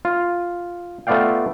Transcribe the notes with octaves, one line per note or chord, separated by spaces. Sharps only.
F4
A3 B3 F4 D5 F5 G5